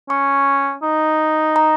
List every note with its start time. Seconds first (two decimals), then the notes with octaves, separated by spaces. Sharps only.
0.09 C#4 C#6
0.83 D#4
1.56 A#5